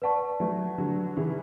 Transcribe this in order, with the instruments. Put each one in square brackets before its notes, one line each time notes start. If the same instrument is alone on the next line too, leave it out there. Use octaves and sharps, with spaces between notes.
[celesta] B4 D5 F#5 A5 C#6
[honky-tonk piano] F#3 A3
D3 F#3
C#3 E3